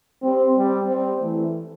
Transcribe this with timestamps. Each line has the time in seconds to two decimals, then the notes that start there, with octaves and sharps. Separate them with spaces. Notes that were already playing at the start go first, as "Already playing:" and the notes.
0.22 G3 C4
0.56 G3 C4
0.88 G3 C4
1.21 E3 A3